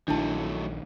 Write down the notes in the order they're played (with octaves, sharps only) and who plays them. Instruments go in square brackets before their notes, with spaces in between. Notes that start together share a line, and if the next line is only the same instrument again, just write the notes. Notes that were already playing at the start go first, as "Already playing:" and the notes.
[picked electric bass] A#1 D#3 [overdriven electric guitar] F#3 A3 [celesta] D4 E4 A5